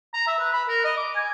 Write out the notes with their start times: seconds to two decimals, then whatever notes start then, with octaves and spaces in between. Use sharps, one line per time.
0.13 A#5
0.27 E5
0.39 B4
0.53 B5
0.68 A#4
0.84 D#5
0.97 D6
1.16 G#5